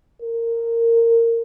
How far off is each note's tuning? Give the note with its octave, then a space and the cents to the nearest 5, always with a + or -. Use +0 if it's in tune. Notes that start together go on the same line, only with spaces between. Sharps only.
A#4 -15